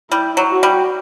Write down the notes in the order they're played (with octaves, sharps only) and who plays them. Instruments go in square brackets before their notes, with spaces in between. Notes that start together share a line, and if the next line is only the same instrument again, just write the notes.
[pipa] G3 [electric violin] E4
[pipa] F#3
[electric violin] F#4
[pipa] G3